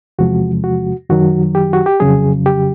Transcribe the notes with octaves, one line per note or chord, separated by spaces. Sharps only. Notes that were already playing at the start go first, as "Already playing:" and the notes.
E2 C3 F3 G#3 F#4
F#4
F#2 D#3 F#3 F#4
G4
F#4
G4
F2 C#3 F#3 G#4
G4